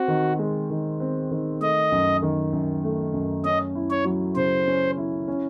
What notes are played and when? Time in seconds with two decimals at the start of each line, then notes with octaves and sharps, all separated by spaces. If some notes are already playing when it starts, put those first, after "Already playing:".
Already playing: C4 F#4
0.08 D#3
0.39 G#3
0.70 D#3
1.00 C4
1.31 D#3
1.61 A3 D#5
1.92 F#2
2.22 D#3
2.53 F#2
2.84 A3
3.13 F#2
3.44 C#4 D#5
3.75 E4
3.91 C#5
4.05 F#3
4.36 C#3 C5
4.67 C#4
4.97 E4
5.28 C#4